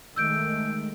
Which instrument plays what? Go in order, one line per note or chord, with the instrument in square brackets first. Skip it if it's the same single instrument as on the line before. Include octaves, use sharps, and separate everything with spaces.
[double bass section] D#3 G#3 A3 [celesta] E6 G6 D7